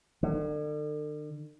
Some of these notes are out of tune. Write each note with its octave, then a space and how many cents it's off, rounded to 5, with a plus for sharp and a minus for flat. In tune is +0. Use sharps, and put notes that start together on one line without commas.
D3 +40